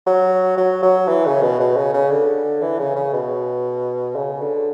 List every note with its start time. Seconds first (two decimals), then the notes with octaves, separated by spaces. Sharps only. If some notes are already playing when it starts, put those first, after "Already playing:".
0.06 F#3
0.57 F#3
0.83 F#3
1.08 E3
1.26 C#3
1.42 B2
1.60 B2
1.77 C#3
1.94 C#3
2.11 D3
2.62 E3
2.79 C#3
2.96 C#3
3.13 B2
4.16 C#3
4.41 D3